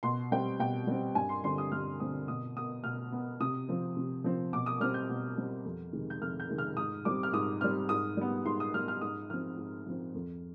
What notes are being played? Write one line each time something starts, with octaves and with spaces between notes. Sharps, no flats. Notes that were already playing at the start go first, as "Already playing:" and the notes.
B2 C6
G3 C4 G5
B2 G5
G3 C4
G2 G#5
C6
D3 G3 C4 C6
D#6
G2 F6
D3 G3 C4 D#6
B2 D#6
B3 D#6
B2 F6
B3
C3 D#6
F3 C4
C3
F3 C4
B2 D6
D#6
G3 C4 F6
G6
B2
G3 C4
F2
C3 D#3 G#3
G6
F2 F6
G6
C3 D#3 G#3
F6
G#2 D#6
G3 C4 D6
F6
G#2 D#6
G3 C4 F6
G#2 D#6
G3 B3
G#2 C6
D#6
G3 B3 F6
F6
G#2 D#6
F3 C4 F6
G#2
F3 C4
F2